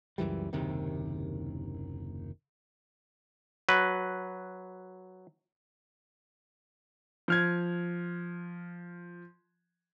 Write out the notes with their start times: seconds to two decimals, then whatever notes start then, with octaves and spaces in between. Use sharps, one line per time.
0.18 C#2 F#2 E3 G3
0.53 F#1 D#2 C3 D#3
3.69 F#3 B4
7.28 F3 F6 G#6